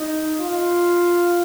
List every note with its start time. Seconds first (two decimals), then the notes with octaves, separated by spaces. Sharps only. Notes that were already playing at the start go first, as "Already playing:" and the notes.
Already playing: D#4
0.40 F4